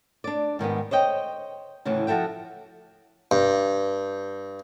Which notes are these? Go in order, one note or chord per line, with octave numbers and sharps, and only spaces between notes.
D4 D5
G#2 D#3 G3 B3
C5 C#5 D#5 G5
D2 A2 C#3 E3
F3 F#4 A4 E5 G5
G2